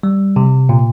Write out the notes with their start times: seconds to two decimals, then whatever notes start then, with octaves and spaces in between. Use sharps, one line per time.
0.03 G3
0.36 C3
0.69 A#2